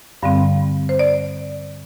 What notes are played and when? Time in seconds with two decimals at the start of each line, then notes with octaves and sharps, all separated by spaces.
0.22 G2 D3 G3 C4 F5
0.89 C5
0.99 D5